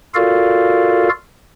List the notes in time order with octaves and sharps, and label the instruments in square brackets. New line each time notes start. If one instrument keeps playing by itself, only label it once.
[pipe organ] F4 F#4 A4 A#4 D5 F5